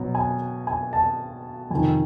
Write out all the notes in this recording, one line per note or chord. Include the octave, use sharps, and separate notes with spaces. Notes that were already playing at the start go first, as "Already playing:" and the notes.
Already playing: B2 F#3 B3
G#5
G#5
A5
F2 C3 D#3 G#5